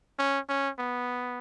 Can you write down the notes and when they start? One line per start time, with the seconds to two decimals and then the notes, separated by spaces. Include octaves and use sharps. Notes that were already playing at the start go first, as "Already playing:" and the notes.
0.19 C#4
0.49 C#4
0.78 B3